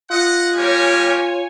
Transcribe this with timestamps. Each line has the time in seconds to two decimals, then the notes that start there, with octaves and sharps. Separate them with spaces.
0.10 F4 D#5 F#5
0.55 G3 G4 A#4 C#5 G#5